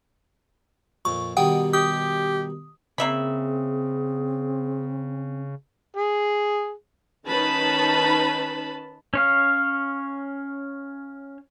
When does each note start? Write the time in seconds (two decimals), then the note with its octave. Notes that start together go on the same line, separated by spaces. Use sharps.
1.05 F2 A#2 C#6
1.37 B2 D#3 G3 F#5 G5 D#6
1.73 G4 D#6
2.98 C#3 A#3 C4 G#4 E5 B5
5.97 G#4
7.27 D#3 C#4 D#4 B4 A5 B5
9.14 C#4 C#5 F5